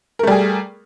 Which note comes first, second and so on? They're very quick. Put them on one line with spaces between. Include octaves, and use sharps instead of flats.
A#4 A3 G3 G#4